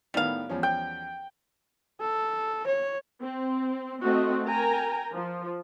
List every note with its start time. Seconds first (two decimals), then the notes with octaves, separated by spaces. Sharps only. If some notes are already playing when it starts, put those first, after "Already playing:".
0.14 A2 D#3 G3 B3 F5
0.49 E2 F3 C#4
0.63 G5
2.01 A4
2.67 C#5
3.22 C4
4.03 A3 C4 F#4 D#5
4.46 A#4 G5 G#5 A#5
5.13 F3